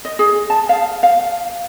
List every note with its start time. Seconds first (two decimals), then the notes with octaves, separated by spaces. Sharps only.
0.05 D#5
0.19 G#4
0.50 A5
0.69 F5
1.03 F5